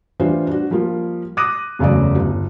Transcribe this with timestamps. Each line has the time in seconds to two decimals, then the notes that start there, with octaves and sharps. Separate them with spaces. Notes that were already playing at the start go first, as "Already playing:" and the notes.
0.20 E3 G3 D4 F4 C5
0.47 D4 F#4
0.71 F3 G3 A#3 F4
1.37 D6 D#6 F#6 A#6 D#7
1.79 E1 F#2 C#3 A3 F#4 D5
2.16 G1